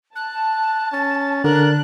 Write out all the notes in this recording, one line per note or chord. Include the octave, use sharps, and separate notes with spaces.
A5 F#6
C#4 A6
D3 D4 A#4 F#6